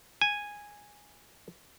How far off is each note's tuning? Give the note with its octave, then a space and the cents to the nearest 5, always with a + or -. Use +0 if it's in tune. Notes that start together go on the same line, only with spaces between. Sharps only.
G#5 -5